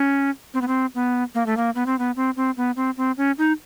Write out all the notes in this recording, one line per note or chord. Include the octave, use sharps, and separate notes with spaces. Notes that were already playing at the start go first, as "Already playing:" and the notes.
Already playing: C#4
C4
B3
C4
B3
A#3
A3
A#3
B3
C4
B3
C4
C4
B3
C4
C4
C#4
D#4